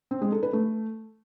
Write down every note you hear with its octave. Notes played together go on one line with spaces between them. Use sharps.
C4
G#3
A4
B4
A3